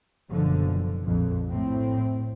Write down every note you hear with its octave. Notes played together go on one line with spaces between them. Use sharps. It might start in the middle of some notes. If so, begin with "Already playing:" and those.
F#1 B2 D3 F3
A#1 F2
A2 C4